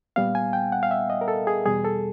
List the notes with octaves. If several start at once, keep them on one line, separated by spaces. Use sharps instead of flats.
A#2 G3 B3 F5
G#5
G5
F#5
F5
E5
D#5
A#4
A4
G#4
E2 B2 G3 G#4
A4